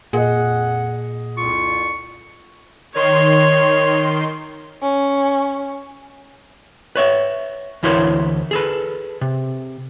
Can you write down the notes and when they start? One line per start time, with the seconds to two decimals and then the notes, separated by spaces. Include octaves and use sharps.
0.13 F2 A#2 G#4 D#5 F#5
1.37 C2 F2 F4 C#6
2.95 D#3 C#5 C6
4.82 C#4
6.96 B4 C#5 E5
7.83 D2 E3 E4 A#4 C5 C#5
8.51 G#4 A4 B4
9.21 C3